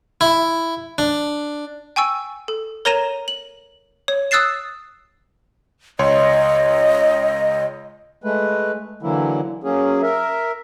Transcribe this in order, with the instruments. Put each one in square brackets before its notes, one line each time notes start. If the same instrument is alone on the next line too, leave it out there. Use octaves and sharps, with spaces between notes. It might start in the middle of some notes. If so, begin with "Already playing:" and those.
[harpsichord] E4
D4
[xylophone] G5 G#5 C#6 E6
A4
A#4 C#5 A#5 A#6 D#7 E7
F#7
C#5
D#6 E6 F#6 A6 C7 E7
[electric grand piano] C#2 C#5 C6 [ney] D#5
[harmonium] G#3 A3 B4
D3 E3 F#3 A#3 E4
F#3 A#3 C#4 G#4
A#4 E5